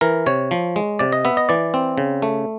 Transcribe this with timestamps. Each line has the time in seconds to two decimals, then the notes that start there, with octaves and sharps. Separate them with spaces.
0.01 E3 A#4
0.26 C3 C#5
0.51 F3
0.76 G#3
0.99 C3 D5
1.12 D#5
1.25 B3 E5
1.37 D#5
1.49 E3 D5
1.74 C4
1.98 C#3
2.22 A3